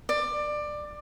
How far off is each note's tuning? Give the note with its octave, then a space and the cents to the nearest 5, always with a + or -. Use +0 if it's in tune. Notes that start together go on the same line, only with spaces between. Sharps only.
D5 +20